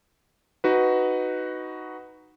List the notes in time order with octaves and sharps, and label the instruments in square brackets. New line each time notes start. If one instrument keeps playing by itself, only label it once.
[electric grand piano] D#4 F#4 B4